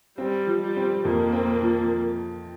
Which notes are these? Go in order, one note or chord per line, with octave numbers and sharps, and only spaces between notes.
G3 C4
F3
G3
C4
F2 A#3
C4
F3